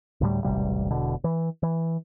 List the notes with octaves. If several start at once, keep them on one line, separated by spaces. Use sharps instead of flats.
D2 A2 G3
E1 A1 C3 G3
E1 B2 D3
E3
E3